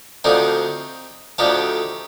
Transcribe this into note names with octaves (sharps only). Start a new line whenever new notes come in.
D2 D3 F3 C4 D#4
D2 D3 F3 D#4 G4